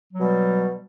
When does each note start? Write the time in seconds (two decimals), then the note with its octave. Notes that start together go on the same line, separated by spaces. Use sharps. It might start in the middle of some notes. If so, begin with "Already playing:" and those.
0.12 F#3
0.16 G3
0.20 B2